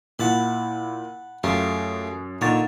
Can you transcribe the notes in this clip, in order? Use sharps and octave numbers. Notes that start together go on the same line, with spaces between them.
A#2 E4 F#5 A5 B5
F#2 A3 F4 G4
A#2 D3 D#4 C#5 A6